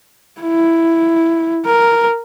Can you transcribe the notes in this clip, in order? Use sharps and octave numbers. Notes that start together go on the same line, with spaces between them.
E4
A#4